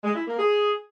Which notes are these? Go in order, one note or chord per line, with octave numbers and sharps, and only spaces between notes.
G#3
E4
A#3
G#4